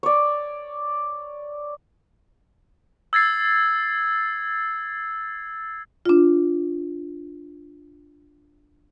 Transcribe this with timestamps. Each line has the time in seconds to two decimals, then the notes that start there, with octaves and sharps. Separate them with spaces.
0.03 C#5 D5
3.13 E6 G#6 A6 C7
6.06 D4 F4